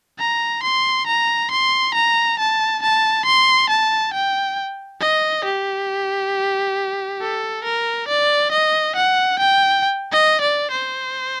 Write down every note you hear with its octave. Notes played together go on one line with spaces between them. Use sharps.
A#5
C6
A#5
C6
A#5
A5
A5
C6
A5
G5
D#5
G4
A4
A#4
D5
D#5
F#5
G5
D#5
D5
C5